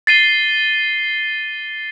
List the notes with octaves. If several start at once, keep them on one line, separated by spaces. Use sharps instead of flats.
A6 C7 D#7 G7